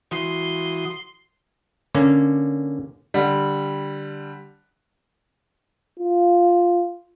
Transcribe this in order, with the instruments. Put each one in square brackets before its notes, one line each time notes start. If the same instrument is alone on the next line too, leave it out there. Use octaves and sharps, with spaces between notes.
[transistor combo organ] E3 F#4 D#6 [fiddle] C6
[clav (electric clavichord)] D3 A#3 C#4
[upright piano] D3 G3
[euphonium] F4